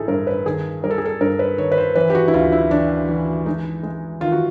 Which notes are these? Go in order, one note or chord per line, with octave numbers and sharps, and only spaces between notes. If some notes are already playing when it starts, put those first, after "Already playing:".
Already playing: A1 D#4 E4 G#4 A4
G2 A#4
B4
D#3 G#4
G3 A#4
A4
G#4
A4
G2 A#4
B4
D#3 C#5
B4
C5
E3 B4
G4
F#4
E4
D2 F4
E4
E3 D4
E3
G#3 D#4
G#3
D#3 F4
F#4